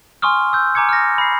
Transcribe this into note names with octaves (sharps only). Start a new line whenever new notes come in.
G#5 C6 C#6 D#6 F6
E6 G6
G#5 A#5 D6 G#6 C#7
F6 A#6
B5 C7